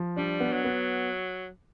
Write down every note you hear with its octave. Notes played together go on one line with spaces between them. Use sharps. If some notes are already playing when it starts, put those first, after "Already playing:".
Already playing: F3
G3 D4
B3
F#3
B3